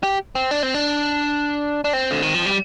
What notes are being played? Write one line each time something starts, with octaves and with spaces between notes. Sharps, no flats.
G4
C4
D4
C4
D4
D4
C4
D3
D#3
F3
G3